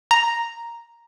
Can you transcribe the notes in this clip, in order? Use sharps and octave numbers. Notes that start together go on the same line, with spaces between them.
A#5